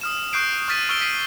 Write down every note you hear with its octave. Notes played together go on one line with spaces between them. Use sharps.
D#6 F6 E7
C#6 D#6 F#6 G6 C7 D7
C#6 F6 A6 B6 D#7
C#6 E6 F6 D7 G7
B6 C7 D#7